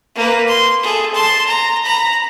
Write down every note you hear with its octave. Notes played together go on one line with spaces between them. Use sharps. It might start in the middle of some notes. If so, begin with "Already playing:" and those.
A#3 B4
C6
G#4 A4
A5 C6
A#5
A#5 B5